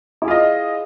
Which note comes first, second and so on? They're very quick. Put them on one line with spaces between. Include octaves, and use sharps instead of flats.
E4 G#4 F4 D#5